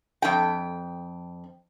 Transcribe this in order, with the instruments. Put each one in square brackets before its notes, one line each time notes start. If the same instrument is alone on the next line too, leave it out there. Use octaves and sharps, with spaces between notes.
[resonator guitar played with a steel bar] F2 G5